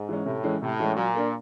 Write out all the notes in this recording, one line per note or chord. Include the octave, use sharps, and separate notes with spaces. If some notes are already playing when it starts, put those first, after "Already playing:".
Already playing: G#2
E3 G#3 C#4
A2 C3
E3 G#3 C#4
A2 C3
E3 G#3 C#4
A#2 F#3
A#3 D4